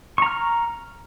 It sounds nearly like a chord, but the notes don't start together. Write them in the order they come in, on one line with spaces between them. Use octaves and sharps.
C#6 A#5 F6